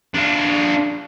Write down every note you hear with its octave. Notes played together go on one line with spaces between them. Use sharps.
D4 F4